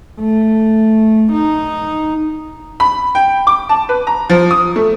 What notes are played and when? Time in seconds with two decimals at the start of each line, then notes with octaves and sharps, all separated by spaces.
0.20 A3
1.32 D#4
2.80 B5
3.15 G5
3.47 D6
3.69 A5
3.89 B4
4.07 A#5
4.30 F3
4.51 D#6
4.76 A3